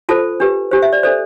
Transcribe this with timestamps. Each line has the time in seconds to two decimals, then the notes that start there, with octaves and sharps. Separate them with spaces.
0.09 F4 A4 C5 A5
0.40 D4 G4 B4
0.71 D4 G4 C5
0.82 E5
0.93 D5
1.03 D4 A4 C5 D5